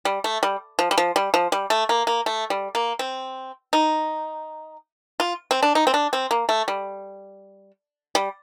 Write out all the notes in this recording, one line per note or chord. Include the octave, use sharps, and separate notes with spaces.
G3
A3
G3
F3
G3
F3
G3
F3
G3
A3
A#3
A#3
A3
G3
A#3
C4
D#4
F4
C4
D4
D#4
C4
D4
C4
A#3
A3
G3
G3